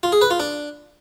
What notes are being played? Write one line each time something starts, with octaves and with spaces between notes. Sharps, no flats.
F4
G#4
B4
F4
D4